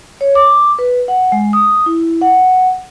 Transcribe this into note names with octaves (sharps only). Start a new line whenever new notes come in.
C#5
D6
B4
F#5
G#3
D#6
E4
F#5